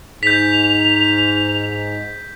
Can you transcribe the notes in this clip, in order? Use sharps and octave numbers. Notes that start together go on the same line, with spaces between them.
G#2 G6 B6 F7